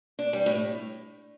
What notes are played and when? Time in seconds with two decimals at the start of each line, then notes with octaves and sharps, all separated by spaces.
0.19 D4
0.33 G3
0.46 A2